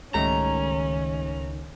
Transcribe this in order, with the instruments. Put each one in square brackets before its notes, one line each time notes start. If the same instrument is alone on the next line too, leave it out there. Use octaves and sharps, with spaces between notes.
[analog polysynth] C#2 D#3 [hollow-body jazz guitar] G#2 G3 A3 [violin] C#4 [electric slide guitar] A#5